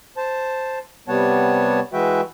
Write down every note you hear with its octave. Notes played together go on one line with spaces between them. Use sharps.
C5 A5
C3 G3 B3 C#5 F#5 A5
E3 G#3 F#4 B4 E5 G5